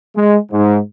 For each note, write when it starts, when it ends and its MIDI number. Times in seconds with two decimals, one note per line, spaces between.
0.16 0.38 56
0.51 0.79 44